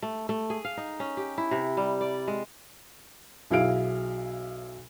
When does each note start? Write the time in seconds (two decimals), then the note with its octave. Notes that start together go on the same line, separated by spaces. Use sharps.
0.02 A3
0.29 A3
0.50 G#4
0.65 F5
0.77 D#4
1.00 C#4
1.17 G4
1.38 E4
1.51 C3
1.77 G3
2.01 D5
2.28 G#3
3.50 B1 F#3 E4 G#4 F5 D7